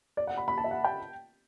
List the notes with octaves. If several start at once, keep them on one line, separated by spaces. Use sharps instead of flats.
D5
F#5
B5
B5
A5
E5
F#5
G5